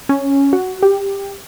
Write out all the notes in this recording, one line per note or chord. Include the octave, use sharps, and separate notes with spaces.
C#4
F#4
G4